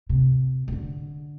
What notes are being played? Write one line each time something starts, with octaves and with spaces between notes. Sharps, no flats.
C3
C3
D3